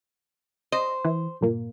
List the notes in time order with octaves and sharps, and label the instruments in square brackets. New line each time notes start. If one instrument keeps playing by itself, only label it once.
[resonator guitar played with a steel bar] C5 [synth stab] D#5
[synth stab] E3
G1 A#2 A#3